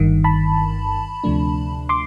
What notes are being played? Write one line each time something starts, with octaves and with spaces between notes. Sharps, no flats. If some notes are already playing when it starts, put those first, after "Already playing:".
Already playing: G1 G2 D#3
A5 B5
D2 C3 F3 A3 D4
C6 D6